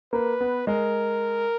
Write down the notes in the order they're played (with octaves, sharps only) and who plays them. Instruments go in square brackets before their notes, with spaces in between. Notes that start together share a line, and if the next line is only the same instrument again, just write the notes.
[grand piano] A#3 [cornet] B4
[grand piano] B3
[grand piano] G#3 [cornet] A#4